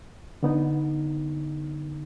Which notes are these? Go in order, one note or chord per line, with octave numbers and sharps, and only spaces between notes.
D3 B3 D#4